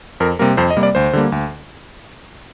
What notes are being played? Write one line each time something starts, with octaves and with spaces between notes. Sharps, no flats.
F2 A#4
C3 G3 A#3 A#4
F2 C5
D#5
C3 G3 A#3
D5
D2 C5
D3 G3 A#3
D2